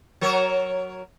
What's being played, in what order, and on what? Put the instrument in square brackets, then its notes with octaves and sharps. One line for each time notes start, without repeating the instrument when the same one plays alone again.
[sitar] F#3 A#4 C#5